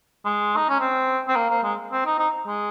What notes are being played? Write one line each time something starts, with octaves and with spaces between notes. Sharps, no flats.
G#3
D#4
C#4
C4
C4
A#3
A#3
G#3
C4
D#4
D#4
G#3